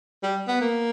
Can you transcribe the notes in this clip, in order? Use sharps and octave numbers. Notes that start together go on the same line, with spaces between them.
G3
B3
A#3